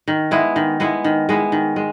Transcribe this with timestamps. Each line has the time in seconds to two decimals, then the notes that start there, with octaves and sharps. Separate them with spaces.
0.08 D#3
0.31 G#3 B3 E4
0.56 D#3
0.80 G#3 B3 E4
1.04 D#3
1.29 G#3 B3 E4
1.52 D#3
1.76 G#3